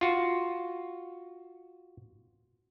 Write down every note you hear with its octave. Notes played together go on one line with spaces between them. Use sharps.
F4 F#4